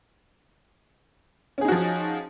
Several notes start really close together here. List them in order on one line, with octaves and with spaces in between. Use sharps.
C#4 G#4 D#4 F#4 F3